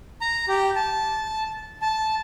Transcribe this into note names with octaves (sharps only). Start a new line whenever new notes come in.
A#5
G4
A5
A5